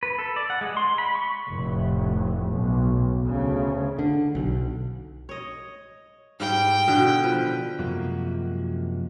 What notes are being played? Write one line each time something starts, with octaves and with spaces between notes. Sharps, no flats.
B4
A4
D5
F#5
G#3
C6
B5
C#6
F1 A2
B1
D2 C#3
D3
B1
C#5 D#5
G#2 G3 G5
B2 D3 E3
F3 B4
F#2 C3 F3 G#3 A#3 F#4